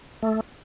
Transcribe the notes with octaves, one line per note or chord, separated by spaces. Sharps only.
A3